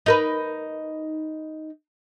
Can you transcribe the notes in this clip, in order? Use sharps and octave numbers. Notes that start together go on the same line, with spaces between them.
D#4 A#4 B4